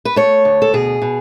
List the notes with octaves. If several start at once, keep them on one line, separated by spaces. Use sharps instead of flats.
B4
A3 C#5
D2
A4
B2 G#4
B2